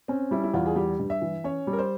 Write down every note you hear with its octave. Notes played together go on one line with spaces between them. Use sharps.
C4 C#4
G3 E4
E4
E2 F4
G#4
G3 G4
G2
E5
E3
C#4 C#5
G3
A#4
C5